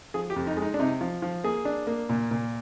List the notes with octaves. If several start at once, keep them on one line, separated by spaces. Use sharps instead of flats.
F3 G#4
G4
F2
D#4
G#3
D#4
D4
C3 D#4
F3
F3
A#3 G#4
D4
A#3
A#2
A#2